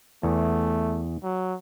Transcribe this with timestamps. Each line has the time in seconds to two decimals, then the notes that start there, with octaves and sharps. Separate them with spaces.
0.23 E2 A3
1.23 F#3